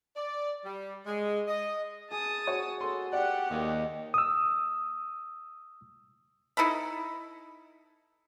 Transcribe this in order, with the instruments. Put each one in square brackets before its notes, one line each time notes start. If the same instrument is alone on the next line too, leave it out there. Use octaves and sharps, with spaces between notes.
[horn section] D5
G3
G#3
D#5
[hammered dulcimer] G#4 [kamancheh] A5 D#6
[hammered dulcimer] F#4 [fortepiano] C#5
[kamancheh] A4 [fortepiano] C6
[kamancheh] G4 [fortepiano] D5 [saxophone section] F#5
[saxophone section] D#2 [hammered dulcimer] D#5 D6
[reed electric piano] D#6 E6
[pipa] D#4 E4 A4 B5